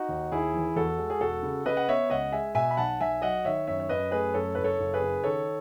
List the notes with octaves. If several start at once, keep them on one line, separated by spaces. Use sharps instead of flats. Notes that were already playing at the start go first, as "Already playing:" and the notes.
Already playing: D#4 F#4
D#2
D#2 E4 G#4
E3
E2 F#4 A4
G#3
G#4
E1 F#4 A4
C#3
C#3 B4 D#5
F#5
B3 C#5 E5
C#2 D#5 F#5
G#3 E5 G#5
B2 E5 G#5
B5
B1 F#5 A5
B1 E5 G#5
F#3 D#5 F#5
D#3 C#5 E5
F#2 C#5 E5
C#5
F#2 B4 D#5
A3 G#4 B4
F#2 A4 C#5
F#1 B4
A4 C#5
F#1
G#4 B4
C#3
D#3 A4 C#5